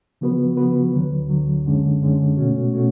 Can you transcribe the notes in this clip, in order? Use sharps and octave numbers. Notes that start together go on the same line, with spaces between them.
C#3 F3 B3 F#4 B4
C#3 F3 B3 F#4 B4
D2 D3 F#3
D2 D3 F#3
F#2 D3 G#3 C#4
F#2 D3 G#3 C#4
B2 A3 C#4 F#4
B2 A3 C#4 F#4